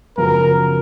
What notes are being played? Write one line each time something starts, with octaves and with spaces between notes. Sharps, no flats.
F#2 C#3 F3 B3 F#4 A#4